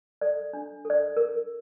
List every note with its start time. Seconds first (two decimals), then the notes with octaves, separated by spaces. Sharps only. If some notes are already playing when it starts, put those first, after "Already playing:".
0.21 A4 D5
0.53 D4
0.85 A4
0.90 D5
1.17 A#4